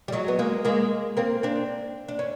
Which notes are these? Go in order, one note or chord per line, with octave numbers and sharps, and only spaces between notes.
G3
F#3 G#3
B3
G#3 A#3
G#3 A#3
A#3 C4
C4 D4
D4
C#4